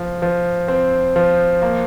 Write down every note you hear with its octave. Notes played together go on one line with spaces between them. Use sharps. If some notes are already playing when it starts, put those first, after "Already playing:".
Already playing: F3
F3
C4
F3
A#3